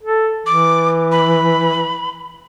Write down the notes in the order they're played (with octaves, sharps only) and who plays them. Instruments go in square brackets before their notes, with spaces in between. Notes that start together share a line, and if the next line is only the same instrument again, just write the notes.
[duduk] A4
[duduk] E3 [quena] D6
[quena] B5